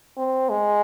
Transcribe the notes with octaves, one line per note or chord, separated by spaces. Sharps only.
C4
G#3